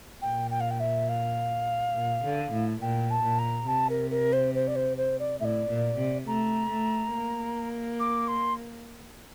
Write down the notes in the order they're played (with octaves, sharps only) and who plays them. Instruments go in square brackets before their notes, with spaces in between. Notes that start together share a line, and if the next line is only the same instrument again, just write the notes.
[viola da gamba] A#2 [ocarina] G5
[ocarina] G5
F5
G5
E5
F5
[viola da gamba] A#2
D3
A2
[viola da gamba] A#2 [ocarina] G5
[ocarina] A5
[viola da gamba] A#2
[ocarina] A#5
[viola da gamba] C3 [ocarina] A5
[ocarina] A#4
A#4
C5
C5
D5
C5
C5
D5
[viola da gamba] A2 [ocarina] E5
[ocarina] D5
[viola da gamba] A#2
C3
[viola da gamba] A3 [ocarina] A#5
[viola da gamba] A3
A#3
[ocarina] D6
C6